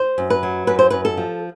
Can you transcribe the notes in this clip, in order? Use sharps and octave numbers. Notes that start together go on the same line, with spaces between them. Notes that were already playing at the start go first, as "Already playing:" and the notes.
Already playing: C5
F#2
B4
F#3
F#2 B4
C5
F#2 B4
A4
F3